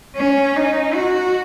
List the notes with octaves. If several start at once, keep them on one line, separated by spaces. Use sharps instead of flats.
C#4
D#4
F#4